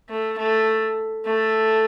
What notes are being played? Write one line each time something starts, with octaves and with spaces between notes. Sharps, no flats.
A3
A3
A3